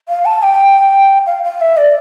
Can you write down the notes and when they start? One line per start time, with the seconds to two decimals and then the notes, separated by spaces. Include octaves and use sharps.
0.09 F5
0.26 A5
0.43 G5
1.27 F5
1.44 F5
1.61 E5
1.77 D5